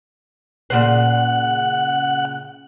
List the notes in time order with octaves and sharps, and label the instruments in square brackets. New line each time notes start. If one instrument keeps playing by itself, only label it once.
[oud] A#2 C#3 C5 [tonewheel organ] F#5